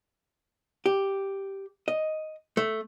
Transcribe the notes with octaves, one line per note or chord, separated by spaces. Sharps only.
G4
D#5
A3